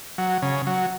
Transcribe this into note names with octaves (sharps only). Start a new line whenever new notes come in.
F#3
C#3
F#3